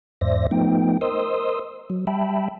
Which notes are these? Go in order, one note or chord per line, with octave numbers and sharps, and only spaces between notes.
E2 G#2 C5 D5 E5 A#6
F3 A3 B3 D#4 G5
A#4 C5 D#5 C6 D#6 E6
F#3
G3 E5 G5 A5 B5